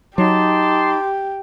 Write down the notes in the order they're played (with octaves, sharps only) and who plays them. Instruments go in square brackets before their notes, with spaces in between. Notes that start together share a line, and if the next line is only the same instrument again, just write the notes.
[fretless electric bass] F#3 [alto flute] D#4 [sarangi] G4 [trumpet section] A5 C6 D6